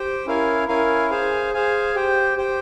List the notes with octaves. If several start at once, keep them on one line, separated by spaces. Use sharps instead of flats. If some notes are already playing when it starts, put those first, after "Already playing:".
Already playing: G4 C5 G5
C#4 E4 A#4 F5 G#5
C#4 E4 A#4 F5 G#5
G#4 C5 F5 G#5
G#4 C5 F5 G#5
G4 C5 G5
G4 C5 G5